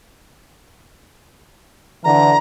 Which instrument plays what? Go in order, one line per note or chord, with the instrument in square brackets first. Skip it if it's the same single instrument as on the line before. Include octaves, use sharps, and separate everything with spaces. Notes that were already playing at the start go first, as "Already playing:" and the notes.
[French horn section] D3 E3 [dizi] A#5